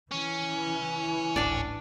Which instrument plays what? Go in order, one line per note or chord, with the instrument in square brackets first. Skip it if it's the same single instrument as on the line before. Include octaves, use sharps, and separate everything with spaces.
[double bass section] E3 [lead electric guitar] C#4
[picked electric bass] D1 G#1 A2 [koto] D4 D5